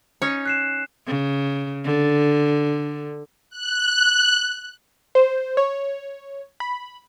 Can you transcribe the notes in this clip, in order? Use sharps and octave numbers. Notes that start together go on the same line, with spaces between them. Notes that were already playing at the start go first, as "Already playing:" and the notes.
C#4 D#4 C#5
F#6 C7 E7
C#3
D3
F#6
C5
C#5
B5